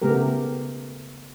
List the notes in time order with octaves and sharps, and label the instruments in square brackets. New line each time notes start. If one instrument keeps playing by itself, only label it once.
[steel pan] C#3 A3 B3 G4 A#4